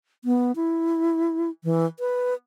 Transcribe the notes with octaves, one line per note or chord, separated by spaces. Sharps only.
B3
E4
E3
B4